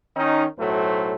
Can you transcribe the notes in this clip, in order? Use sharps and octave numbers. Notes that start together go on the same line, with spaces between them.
D#3 C#4 D#4
B1 A2 F#3 A3 C5